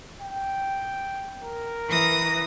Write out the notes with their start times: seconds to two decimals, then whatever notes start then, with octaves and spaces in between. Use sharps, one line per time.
0.22 G5
1.43 A#4
1.89 E3 D#6 A#6